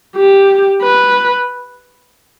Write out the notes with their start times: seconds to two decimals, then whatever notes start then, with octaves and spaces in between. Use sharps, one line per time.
0.16 G4
0.82 B4